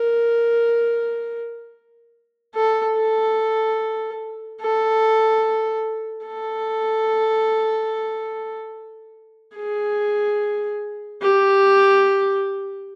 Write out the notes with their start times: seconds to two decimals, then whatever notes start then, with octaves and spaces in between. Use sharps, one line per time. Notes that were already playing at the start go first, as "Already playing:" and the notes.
Already playing: A#4
2.55 A4
2.96 A4
4.61 A4
6.26 A4
9.57 G#4
11.22 G4